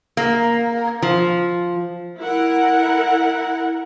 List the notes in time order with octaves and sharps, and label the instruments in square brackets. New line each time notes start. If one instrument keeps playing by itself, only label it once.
[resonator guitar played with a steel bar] A#3
F3
[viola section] E4 A#4 F#5